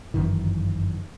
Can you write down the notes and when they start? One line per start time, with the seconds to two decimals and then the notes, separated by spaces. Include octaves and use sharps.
0.14 G1 F#2 D#3 E3